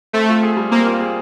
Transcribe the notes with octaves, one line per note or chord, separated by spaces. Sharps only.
A3 C4
F4
G#4
G3
A#3 C4
F4
G#4